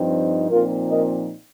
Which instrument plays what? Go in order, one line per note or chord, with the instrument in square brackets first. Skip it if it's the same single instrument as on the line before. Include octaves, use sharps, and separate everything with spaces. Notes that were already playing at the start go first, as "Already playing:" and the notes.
Already playing: [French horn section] G2 F3 C4 D#4
A#2 F3 C4 D#4 F4 A#4
A#4 D#5